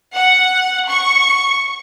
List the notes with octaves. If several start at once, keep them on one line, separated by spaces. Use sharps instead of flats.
F#5
C#6